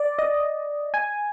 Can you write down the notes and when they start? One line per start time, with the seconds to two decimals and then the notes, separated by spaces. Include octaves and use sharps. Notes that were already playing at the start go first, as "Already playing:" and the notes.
Already playing: D5
0.19 D#5
0.94 G#5